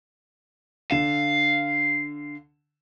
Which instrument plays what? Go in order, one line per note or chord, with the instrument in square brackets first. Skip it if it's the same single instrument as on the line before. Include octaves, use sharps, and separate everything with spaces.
[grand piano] D3 E7 [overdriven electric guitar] F5